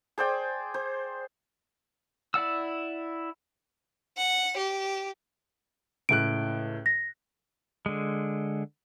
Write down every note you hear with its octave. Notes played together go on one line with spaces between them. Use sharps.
G#4 C5 D5 G5
C5
E4 D5 F#5 E6
F#5
G4
C#2 A2 F#6 D7
A#6
D3 G#3